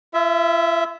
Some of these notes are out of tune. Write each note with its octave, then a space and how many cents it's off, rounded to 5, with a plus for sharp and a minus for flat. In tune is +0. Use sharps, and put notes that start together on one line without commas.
F4 -45 E5 +0